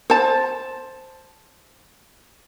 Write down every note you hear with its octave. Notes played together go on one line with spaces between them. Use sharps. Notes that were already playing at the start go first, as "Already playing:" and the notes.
C5 A5